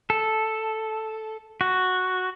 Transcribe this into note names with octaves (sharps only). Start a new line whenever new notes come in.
A4
F#4